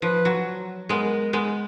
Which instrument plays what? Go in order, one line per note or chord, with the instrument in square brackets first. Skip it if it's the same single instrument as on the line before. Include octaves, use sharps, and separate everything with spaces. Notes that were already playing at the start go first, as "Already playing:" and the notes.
[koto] F3 [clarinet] B4
[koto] F#3
[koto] G#3 B3 [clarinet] A#4
[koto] G#3 B3